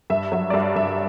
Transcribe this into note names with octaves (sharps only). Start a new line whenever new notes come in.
G2 E5
F#3 E5
D5
G2 E5
G2 E5